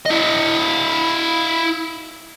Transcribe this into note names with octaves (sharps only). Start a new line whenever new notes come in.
E4 D#5